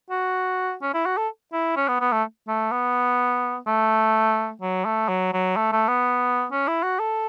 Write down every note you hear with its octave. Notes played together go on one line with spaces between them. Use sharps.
F#4
C#4
E4
F#4
A4
E4
C#4
B3
B3
A3
A3
B3
A3
F#3
A3
F#3
F#3
A3
A3
B3
C#4
E4
F#4
A4